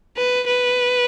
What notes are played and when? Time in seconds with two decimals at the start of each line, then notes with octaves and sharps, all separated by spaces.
0.17 B4
0.47 B4